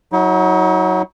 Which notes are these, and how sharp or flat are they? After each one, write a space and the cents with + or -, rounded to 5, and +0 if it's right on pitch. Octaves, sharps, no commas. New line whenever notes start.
F#3 +0 D#4 +45